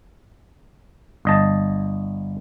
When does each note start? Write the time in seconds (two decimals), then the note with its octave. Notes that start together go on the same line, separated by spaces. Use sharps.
1.25 G1 D#5 A5